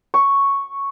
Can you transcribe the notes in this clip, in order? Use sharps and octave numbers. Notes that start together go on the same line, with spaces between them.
C#6